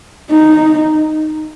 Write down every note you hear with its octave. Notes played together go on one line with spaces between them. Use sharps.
D#4